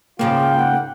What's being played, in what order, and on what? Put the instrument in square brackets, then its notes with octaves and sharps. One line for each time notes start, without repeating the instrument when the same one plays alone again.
[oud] G#2 C#3 F3 [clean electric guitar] A#3 [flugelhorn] F4 [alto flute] G5
[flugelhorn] F#5